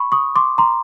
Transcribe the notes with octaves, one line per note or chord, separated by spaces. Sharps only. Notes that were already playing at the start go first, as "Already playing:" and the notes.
Already playing: B5 C#6
C#6 D#6
C6 D6
A#5 C6